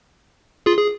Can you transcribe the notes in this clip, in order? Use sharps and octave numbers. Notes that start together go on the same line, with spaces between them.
F4 G#4
G#4